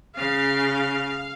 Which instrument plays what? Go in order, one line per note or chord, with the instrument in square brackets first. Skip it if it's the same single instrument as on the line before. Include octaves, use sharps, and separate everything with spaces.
[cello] C#3 [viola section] F5